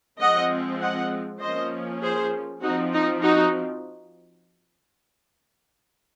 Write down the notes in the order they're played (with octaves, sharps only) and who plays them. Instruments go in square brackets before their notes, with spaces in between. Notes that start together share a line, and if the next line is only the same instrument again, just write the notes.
[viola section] F3 G#3 C4 D#5 F#5
D#5 F#5
F3 A#3 C#4 C5 D#5
G#4 C5
F3 C4 D#4 F#4
D#4
D#4 F#4